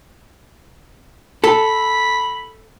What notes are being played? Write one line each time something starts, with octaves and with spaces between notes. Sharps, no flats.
A4 B5